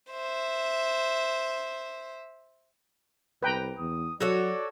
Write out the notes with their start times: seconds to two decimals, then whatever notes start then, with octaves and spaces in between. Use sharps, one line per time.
0.10 C5 E5
3.42 C2 B4 G5 A#5
3.78 E2 D#6
4.20 F#3 F#4 A4 C#5 D5